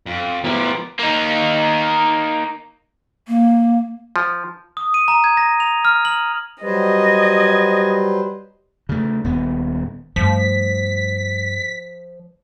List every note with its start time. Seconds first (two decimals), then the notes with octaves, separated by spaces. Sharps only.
0.06 F2
0.44 F3 B3 E4 G4 A#4
0.99 A#3 D#4
3.28 A#3
4.16 F3
4.77 D#6
4.94 D#7
5.08 A#5
5.24 G#6
5.37 A#6
5.60 F7
5.85 F6
6.05 F#7
6.63 F#3 G3 B4 C5 D#5 G#6
8.89 C#3 A3
9.24 D#1 B3
10.16 G2 F3 A3 B6